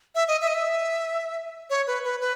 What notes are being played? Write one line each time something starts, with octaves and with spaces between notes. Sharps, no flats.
E5
D#5
E5
D#5
E5
C#5
B4
B4
B4